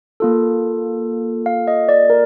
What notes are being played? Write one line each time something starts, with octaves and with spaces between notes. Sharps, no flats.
A#3 F4 A4
F5
D#5
D5
A#4